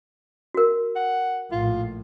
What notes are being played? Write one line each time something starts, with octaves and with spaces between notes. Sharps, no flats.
F#4 A#4
F#5
A#1 A2 F4